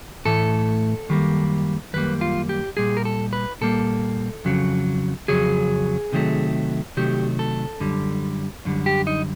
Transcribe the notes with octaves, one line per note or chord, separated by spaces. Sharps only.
A2 E3 A3 A4
F#2 D#3 G3 A#3
F#2 D#3 G3 A#3 B4
F4
G4
A#2 G3 G#4
A#4
A4
B4
A#2 G3 A#3 A4
F2 C#3 F#3
F2 C#3 F#3 G#4
C3 D#3 F#3 A3
C3 D#3 F#3 A3 G4
A4
F#2 D3 G3
F#2 D3 G3
G4
D#4